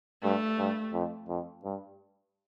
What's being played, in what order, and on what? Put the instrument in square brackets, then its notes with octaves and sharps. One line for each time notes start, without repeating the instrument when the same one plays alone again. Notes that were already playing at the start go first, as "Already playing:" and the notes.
[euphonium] G2 [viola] A3
[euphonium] G2
F2
F2
G2